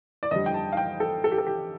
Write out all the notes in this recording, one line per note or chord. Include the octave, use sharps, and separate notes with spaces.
D5
F2 D3 G3 D#5
G5
A5
F5
G5
A4
A4
G4
A4
G4